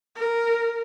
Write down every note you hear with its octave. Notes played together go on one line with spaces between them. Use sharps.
A#4